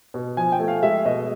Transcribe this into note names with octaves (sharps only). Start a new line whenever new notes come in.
B2
F3 G#5
G5
A3
F5
G#3 E5
B2 D#5